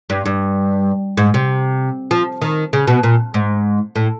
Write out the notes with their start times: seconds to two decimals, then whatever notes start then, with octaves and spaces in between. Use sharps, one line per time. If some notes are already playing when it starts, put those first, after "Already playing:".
0.10 G2
0.26 G2
1.17 G#2
1.34 C3
2.11 F3
2.42 D#3
2.73 C#3
2.87 B2
3.03 A#2
3.34 G#2
3.96 A2